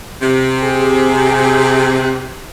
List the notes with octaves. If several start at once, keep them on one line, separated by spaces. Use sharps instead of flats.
C3
G#4